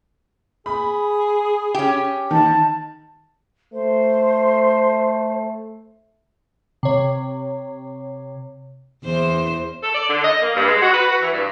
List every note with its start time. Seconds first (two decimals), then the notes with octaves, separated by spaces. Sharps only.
0.66 G#4 B5
1.75 C#4 G4
2.31 D#3 A5
3.73 A3 C5
6.83 C3 C#5
9.04 E2 E3 C5
9.83 A4
9.95 D5
10.10 D3
10.25 D#5
10.42 A#3
10.56 G2
10.68 G#3
10.82 F#4
10.94 B4
11.08 F#4
11.22 E3
11.33 G2